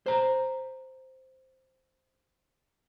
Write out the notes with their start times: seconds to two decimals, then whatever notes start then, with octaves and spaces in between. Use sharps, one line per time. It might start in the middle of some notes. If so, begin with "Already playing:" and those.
0.06 C5 A#5